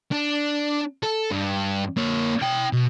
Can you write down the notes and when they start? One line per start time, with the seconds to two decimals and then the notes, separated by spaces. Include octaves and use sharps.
0.12 D4
1.03 A4
1.31 G2
1.97 A#3 C#5
2.42 E4 G5
2.73 B2